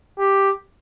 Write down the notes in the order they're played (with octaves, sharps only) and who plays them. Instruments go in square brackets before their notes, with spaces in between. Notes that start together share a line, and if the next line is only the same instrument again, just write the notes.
[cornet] G4